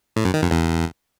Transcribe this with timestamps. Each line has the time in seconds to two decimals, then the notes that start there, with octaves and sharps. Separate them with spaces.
0.16 A2
0.25 F#2
0.34 D#3
0.43 F2
0.51 E2